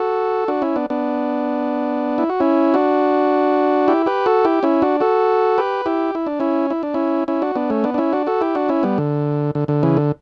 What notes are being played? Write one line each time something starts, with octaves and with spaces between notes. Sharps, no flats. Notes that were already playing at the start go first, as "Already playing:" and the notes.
Already playing: F#4 A4
D4 F#4
C#4 E4
B3 D4
B3 D4
E4
F#4
C#4 E4
D4 F#4
E4 G4
G4 B4
F#4 A4
E4 G4
C#4 E4
D4 F#4
F#4 A4
G4 B4
E4 G4
E4
D4
C#4 E4
E4
D4
C#4 E4
C#4 E4
D4 F#4
B3 D4
A3 C#4
B3 D4
D4
C#4 E4
D4 F#4
F#4 A4
E4 G4
D4 F#4
C#4 E4
G3 B3
D3
D3
D3
C#3 E3
D3